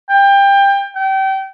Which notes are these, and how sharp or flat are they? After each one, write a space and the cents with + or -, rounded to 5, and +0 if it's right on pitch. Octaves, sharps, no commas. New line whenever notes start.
G5 +20
G5 -30